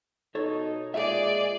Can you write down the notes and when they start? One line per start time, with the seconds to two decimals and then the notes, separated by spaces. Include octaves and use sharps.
0.35 B2 D#4 A4 C#5
0.94 A#2 G#3 G#4 D5 E5